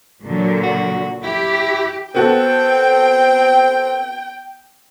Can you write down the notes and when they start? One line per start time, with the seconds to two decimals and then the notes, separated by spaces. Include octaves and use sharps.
0.23 A#2 D3 F#3
0.63 F#4
1.23 E4 G4
2.15 B3 C4 F#4 A4 G5